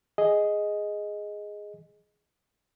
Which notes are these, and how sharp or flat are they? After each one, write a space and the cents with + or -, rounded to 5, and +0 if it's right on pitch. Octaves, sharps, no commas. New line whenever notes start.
G#4 +0 D#5 +0